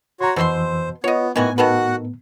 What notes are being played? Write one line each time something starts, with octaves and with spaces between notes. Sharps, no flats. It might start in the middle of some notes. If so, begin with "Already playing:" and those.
F#4 C#5 A#5 C6
F2 B2 E3 C4 C5 C6 E6
B3 F4 C#5 D#5
A2 D#3 E3 B3 F#4 G#5
D#3 F#4 A4 B4 F#5